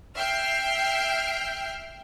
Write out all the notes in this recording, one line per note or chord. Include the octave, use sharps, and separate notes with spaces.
E5 G5 F6 G6 C7